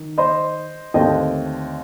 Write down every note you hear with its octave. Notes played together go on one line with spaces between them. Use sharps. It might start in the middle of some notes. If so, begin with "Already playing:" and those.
Already playing: D#3
C5 D#5
D#2 D3 A3 C4 D#5 G5